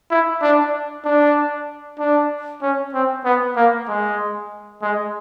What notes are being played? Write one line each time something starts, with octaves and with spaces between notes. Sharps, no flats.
E4
D4
D4
D4
C#4
C4
B3
A#3
G#3
G#3